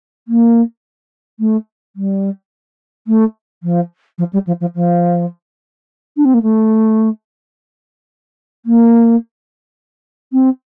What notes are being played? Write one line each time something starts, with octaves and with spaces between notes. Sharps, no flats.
A#3
A3
G3
A3
F3
F3
G3
F3
F3
F3
D4
C4
A#3
A3
A#3
C4